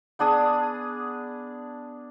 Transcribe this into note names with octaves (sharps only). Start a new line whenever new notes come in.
B3 D4 G#4 D#6